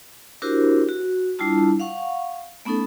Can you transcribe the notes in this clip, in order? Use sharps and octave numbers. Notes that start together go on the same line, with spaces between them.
D4 E4 F#4 G4 A#4 C5
F#4
G3 D4 E4 F4 A5
F5 F#5 C#6
A3 B3 C#4 D#4 A4